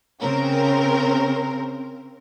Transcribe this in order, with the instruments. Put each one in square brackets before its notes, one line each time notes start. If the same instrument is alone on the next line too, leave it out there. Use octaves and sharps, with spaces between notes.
[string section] C#3 C4 C#4 A#4